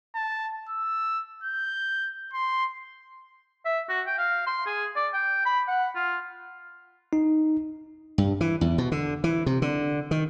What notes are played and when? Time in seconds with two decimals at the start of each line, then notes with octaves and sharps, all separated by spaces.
0.15 A5
0.69 E6
1.44 G6
2.33 C6
3.66 E5
3.89 F#4
4.07 G5
4.19 F5
4.47 C6
4.66 G#4
4.96 D5
5.14 G5
5.46 B5
5.68 F#5
5.96 F4
7.13 D#4
8.18 G2
8.41 E3
8.61 E2
8.78 B2
8.92 D3
9.24 E3
9.46 C3
9.62 D3
10.11 D#3